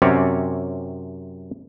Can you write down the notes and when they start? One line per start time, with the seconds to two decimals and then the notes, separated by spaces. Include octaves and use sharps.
0.02 F#2 C3 C4 C#4 C#5 D5